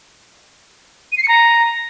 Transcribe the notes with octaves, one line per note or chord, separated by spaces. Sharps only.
D#7
C7
C#7
A#5